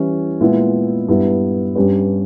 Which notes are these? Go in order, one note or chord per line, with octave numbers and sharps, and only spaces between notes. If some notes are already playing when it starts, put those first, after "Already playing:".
Already playing: E3 G3 C#4 E4
A#2 G#3 B3 E4
G2 G3 B3 E4
G2 G3 C#4 G4 B4